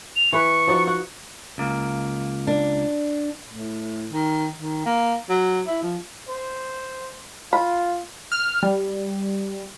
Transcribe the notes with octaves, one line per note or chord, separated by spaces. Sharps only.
F7
E3 B4 C#6
F3 D#4 F#4
F#5
C#2 A#3
D4
A2
D#3
D#3
A#3
F#3
E4
F3
C5
F4 B5
F6
G3